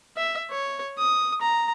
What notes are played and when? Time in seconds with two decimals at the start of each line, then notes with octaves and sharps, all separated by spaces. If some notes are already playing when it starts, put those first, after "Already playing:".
0.17 E5
0.51 C#5
0.98 D#6
1.41 A#5